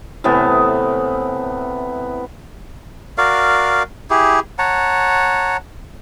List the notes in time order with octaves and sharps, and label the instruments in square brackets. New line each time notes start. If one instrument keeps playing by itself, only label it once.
[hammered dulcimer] A2 C3 E3 B3
[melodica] F#4 A#4 D5 F5
E4 G4 G#4
C#5 F#5 A5 A#5